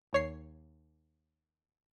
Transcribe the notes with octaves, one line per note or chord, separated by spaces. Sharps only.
D#2 C#5 C7